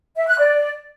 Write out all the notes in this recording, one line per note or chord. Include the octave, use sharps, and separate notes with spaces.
E5
F#6
D5